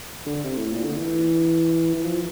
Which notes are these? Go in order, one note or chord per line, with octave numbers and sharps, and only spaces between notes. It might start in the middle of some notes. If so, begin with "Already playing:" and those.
D3
C3
A2
A#2
D3
E3
E3
F3